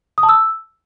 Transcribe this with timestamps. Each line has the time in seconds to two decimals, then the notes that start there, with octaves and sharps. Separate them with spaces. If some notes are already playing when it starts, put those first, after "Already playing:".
0.18 D#6
0.23 A5
0.29 E6